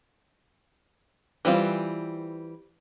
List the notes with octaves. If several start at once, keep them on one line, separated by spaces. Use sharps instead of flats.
E3 G3 C4 F4